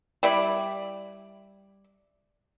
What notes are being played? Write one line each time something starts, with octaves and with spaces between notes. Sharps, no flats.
G3 E4 D5